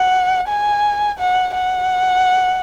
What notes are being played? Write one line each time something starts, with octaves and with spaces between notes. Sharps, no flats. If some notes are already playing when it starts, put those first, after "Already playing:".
Already playing: F#5
G#5
F#5
F#5